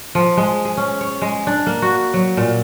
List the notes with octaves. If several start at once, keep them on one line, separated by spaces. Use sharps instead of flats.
F3
G#3
G#4
C#4
C#5
G#3
D4
A#3
F#4
F#3
A#2